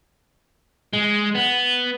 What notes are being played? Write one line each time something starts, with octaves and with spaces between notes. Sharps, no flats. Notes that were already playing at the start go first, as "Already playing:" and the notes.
G#3
B3